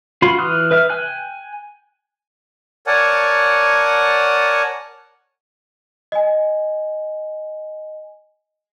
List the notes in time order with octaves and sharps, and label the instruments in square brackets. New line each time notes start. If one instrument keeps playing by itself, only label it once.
[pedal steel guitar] F4 F#4 F5 B5 C6
E3 D#6 F6 F#6
B4 E5 F6
G5 G#5 F#6
[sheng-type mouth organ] A#4 C#5 D5 F#5 G#5 A5
[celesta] D#5 G#5